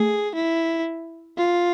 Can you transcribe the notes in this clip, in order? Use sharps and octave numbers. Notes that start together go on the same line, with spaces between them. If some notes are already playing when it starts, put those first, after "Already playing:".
Already playing: A3 G#4
E4
F4